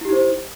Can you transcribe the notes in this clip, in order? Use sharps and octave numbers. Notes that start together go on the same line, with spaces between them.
D#4 E4 G4 C5